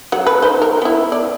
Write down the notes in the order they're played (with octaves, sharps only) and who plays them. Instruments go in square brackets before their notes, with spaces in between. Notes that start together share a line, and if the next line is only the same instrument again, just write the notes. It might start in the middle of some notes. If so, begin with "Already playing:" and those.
[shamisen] F#3 F#5
B4
D#4 C5
A#4
B3 E4
D5